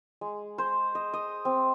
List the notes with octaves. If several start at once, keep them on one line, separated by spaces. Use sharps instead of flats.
G#3
C5
D#5
D#5
C4